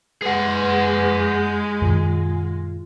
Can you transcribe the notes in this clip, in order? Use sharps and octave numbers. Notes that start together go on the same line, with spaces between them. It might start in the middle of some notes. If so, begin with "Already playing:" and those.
G#3 G#4 B4 F#5
F#2 A#2 D#3 F4